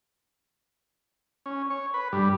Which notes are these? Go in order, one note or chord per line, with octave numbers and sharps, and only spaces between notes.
C#4
C#5
B4
G2